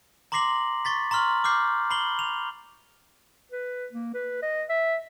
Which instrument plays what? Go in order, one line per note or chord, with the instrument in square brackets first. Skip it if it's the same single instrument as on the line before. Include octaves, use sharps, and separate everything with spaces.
[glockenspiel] A#5 C6 D6 A#6 C7 F#7
C#6 A6 B6
A#5 C6 C#6 F6 F#7
D6 F6 G6 C7
B5 C7 F#7 G7
F7
[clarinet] B4
A#3
B4
D#5
E5